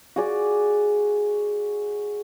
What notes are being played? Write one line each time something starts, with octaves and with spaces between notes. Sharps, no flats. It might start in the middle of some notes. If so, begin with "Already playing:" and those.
F#4 G#4 D5